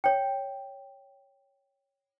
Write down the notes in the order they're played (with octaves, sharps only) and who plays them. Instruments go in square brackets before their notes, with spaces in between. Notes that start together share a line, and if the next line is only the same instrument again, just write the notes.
[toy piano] C#5 G5